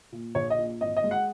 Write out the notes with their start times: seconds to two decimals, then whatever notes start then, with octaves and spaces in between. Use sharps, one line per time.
0.12 A#2
0.35 A#1 C#5
0.50 D#5
0.58 A#2
0.81 G#1 D#5
0.97 D#5
1.04 G#3
1.11 F#5